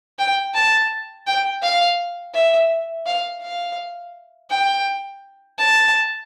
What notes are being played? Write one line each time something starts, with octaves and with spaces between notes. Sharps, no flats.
G5
A5
G5
F5
E5
F5
F5
G5
A5